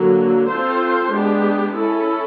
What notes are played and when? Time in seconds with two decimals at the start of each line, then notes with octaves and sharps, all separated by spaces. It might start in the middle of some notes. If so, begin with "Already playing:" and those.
Already playing: D3 F#3 A#3
0.49 C4 F4 A4 C5
1.13 G#3 B3 D4 G4
1.76 C#4 E4 A4